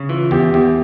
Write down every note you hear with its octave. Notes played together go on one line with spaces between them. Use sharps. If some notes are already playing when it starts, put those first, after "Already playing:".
Already playing: C#3
E3 F4
E2 G4
E2 G4